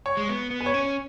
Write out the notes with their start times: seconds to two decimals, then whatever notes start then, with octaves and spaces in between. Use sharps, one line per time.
0.06 C#5
0.18 G#3
0.29 B3
0.51 B3
0.61 B4
0.66 C#5
0.74 C#4